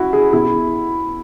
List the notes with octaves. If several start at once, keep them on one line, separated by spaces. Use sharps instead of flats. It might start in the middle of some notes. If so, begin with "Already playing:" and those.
Already playing: C#4 E4 F#4
G#4
B2 E4